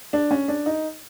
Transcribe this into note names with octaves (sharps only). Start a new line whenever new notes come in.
D4
C#4
D4
D#4